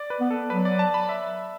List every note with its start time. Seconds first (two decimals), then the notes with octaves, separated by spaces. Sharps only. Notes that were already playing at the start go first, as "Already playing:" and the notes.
Already playing: D5
0.10 B4
0.20 B3
0.31 A4
0.50 F#3 B4
0.65 D5
0.79 A5
0.94 B5
1.09 E5